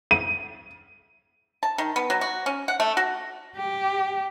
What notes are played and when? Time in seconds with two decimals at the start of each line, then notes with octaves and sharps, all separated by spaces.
0.11 D#7
1.63 A5
1.78 D#3
1.96 B3
2.10 F#3
2.21 F#4
2.46 C#4
2.68 F#5
2.80 A3
2.97 F#4
3.57 G4